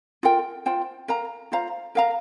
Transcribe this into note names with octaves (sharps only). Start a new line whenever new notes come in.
F4 A#4 G5
F4 C5 G5
A#4 F5 A#5
F4 C5 F5 A#5
A#4 F5 A#5